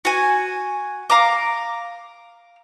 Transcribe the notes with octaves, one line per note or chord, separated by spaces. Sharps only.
F#4 G#5
F5 A#5 D6